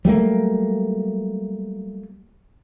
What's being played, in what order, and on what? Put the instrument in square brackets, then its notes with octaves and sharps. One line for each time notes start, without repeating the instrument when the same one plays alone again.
[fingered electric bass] F#3 G3 A3 A#3